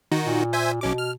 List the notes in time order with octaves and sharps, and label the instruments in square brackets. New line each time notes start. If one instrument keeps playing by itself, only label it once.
[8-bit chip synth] D#3 D#4 F#4
[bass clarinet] A#2
[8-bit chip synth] C5 E5 G#5
[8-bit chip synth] B1 C#4 D6 [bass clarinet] B2
[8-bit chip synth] F6